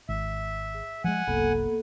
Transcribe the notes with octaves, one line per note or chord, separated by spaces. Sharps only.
G#1 E5
G#4
F3 G3 G#3 F#5 G#5
F#1 C2 A#3 B3 A4